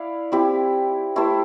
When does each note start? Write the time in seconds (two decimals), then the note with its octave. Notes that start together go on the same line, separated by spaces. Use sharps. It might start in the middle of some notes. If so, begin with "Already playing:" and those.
Already playing: E4 D5 F5
0.32 C4 E4 G4
1.16 A3 E4 G4 C5